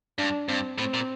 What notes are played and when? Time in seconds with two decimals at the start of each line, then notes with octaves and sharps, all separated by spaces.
0.19 G2 D4
0.48 G2 C4
0.78 A2 C4
0.94 A#2